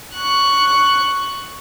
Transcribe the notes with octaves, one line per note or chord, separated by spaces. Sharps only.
C#6 F#6